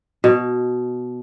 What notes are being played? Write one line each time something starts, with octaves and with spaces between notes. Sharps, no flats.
B2